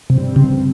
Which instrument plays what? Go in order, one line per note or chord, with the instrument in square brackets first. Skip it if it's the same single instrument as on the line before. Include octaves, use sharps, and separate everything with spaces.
[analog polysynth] G2 G3 C4 [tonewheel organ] C3
[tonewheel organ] C#3